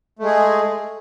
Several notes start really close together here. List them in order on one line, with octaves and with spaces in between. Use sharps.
A3 G#3 G#4